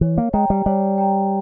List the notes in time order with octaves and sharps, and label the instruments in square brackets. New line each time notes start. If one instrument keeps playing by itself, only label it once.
[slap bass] E3 [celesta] C#5
[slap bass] A#3
[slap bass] G#3 [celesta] G5 A#5
[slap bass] G3
[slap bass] G3 [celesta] C#5
[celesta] G5 A#5